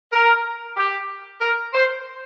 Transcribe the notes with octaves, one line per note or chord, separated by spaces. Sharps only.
A#4
G4
A#4
C5